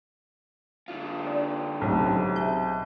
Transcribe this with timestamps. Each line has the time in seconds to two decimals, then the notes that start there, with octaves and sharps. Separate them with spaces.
0.88 D3 F4
1.27 D4
1.81 B1 A2 C3 C#4
2.36 G#4 E5 G6